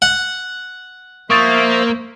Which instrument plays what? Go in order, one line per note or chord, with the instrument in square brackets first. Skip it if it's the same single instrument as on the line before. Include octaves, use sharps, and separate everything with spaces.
[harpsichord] F#5
[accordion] F3 C5 E5 [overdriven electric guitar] A#3 [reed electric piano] C#6 D#6 A6